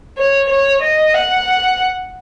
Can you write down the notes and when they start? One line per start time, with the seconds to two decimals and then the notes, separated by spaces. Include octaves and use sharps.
0.18 C#5
0.50 C#5
0.82 D#5
1.14 F#5